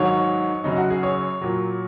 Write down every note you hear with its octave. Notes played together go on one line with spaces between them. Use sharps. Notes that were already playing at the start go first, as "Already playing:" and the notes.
Already playing: G#2 D#3 F#3 C#5
F#2 C#3 F#3 D#4
F#4
G#4
C#5
A#2 F#3